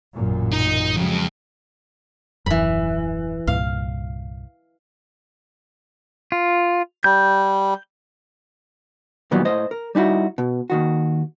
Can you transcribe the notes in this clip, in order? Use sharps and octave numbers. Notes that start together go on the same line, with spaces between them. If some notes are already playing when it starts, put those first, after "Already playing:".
A1 F#2 A#2
D#4
F2 C#3 F#3 G#3
D#1 F#2 E3 B5
C2 G2 A#2 F5
F4
G3 G6
A#2 D#3 E3 F#3 G3 B3
A2 C5 D#5
A#4
G3 D#4 E4 F#4
B2
D#2 D#3 F#4